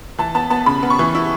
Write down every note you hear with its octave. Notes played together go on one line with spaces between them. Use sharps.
E3 A5
B3 A5
B3 A5
C#3 B5
B3
C#6
E3
E4